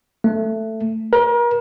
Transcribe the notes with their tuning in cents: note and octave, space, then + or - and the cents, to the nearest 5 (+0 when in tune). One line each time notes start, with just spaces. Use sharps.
A3 +10
A#4 +35